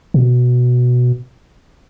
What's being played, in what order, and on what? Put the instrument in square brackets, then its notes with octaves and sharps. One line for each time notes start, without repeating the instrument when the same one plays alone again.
[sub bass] B2